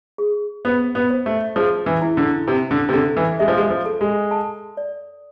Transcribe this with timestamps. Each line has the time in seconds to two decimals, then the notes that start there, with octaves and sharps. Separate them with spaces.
0.18 G#4
0.65 B3 C5
0.95 B3
1.10 C5
1.26 A3
1.56 F3 G#4
1.86 E3
2.02 E4
2.17 D3
2.48 C3 D4
2.71 D3
2.89 C3
2.93 D3 A4
3.17 E3
3.39 G#3 E5
3.48 F3
3.57 G#3
3.70 F3
3.86 A4
4.01 G#3
4.31 A5
4.77 D5